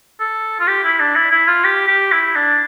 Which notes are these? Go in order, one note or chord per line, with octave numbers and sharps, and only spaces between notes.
A4
F4
G4
E4
D4
E4
E4
F4
G4
G4
E4
D4